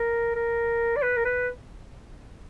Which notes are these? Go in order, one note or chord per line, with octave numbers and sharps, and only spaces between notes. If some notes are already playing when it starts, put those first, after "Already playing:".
Already playing: A#4
A#4
D5
B4
A#4
B4